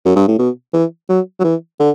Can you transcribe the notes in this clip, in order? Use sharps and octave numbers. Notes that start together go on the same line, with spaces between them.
F#2
G2
A2
B2
E3
F#3
F#3
E3
D3